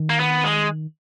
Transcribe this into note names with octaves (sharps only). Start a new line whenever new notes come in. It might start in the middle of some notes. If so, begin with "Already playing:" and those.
Already playing: D#3
A#3
B3
G#3